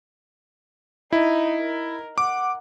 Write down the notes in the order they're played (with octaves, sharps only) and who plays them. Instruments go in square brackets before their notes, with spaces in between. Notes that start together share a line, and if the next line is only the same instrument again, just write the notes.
[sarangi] D#4 [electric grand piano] E4
[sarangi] A#4
[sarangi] F#5 [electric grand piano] D6